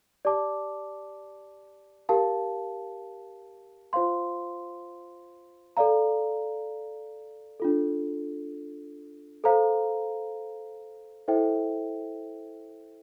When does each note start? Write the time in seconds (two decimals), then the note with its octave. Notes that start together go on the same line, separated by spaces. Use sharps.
0.25 G4 D5 A5 D6
2.09 G4 A#4 F5 A5
3.93 F4 C5 F5 C6
5.77 A4 D5 F5 A#5
7.60 D4 F4 A4
9.44 A4 C5 F5 A#5
11.28 E4 A4 C5 E5 G5